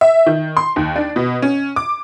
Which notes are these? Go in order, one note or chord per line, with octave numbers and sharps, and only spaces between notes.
E5
D#3
C6
D#2
D4
B2
C#4
D6